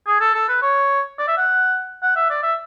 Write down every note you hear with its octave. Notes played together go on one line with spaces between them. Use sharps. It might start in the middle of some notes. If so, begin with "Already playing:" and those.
G#4
A4
A4
B4
C#5
D5
E5
F#5
F#5
E5
D5
E5